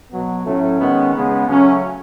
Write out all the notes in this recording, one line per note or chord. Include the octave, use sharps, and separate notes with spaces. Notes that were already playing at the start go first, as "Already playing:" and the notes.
B2 F#3 B3
A2 F#3 A3 C#4
D#3 G#3 B3
C#3 G#3 B3
C#3 F#3 A3 C#4